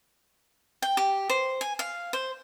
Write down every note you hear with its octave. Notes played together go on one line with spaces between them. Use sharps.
G5
G4
C5
G#5
F5
C5